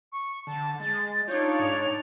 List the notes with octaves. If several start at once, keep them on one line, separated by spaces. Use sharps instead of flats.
C#6
D3 A5
G#3 A6
D4 D#4 F4 C#5 D5 G6
G#2 F7